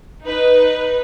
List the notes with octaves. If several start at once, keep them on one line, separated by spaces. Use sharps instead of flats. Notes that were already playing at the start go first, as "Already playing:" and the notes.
D#4 B4